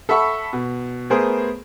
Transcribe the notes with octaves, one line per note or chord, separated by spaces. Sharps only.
A4 E5 F#5 B5 C#6 E6
B2
A3 B3 G#4 A#4 C5